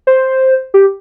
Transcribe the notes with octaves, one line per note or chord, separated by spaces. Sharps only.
C5
G4